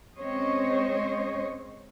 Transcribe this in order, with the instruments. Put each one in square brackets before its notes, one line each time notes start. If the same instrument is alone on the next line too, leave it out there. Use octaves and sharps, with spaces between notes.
[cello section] G#3 C4 C#4 C5 C#5 D#5